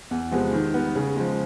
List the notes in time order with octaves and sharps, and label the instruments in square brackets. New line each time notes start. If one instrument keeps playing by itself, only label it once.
[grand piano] E2
C3 F3 G#3 B3
D#3
G3 B3
C#3
F3 G#3